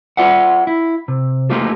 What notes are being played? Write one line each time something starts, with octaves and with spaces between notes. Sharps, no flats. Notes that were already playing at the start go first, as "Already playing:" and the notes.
F4 D5 E5 F#5
E4
C3
A3 A#3 D#4 F4 G4 A4